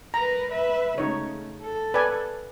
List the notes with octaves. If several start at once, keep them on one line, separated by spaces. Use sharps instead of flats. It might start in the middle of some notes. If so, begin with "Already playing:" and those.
A#4 B4 A#5
B4 E5
C#3 A3 D#4 C#5
A4
B4 D5 G#5